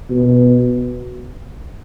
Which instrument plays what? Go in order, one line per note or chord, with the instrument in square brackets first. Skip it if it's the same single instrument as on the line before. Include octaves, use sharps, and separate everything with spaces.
[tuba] B2